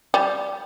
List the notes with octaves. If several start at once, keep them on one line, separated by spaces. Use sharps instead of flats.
G3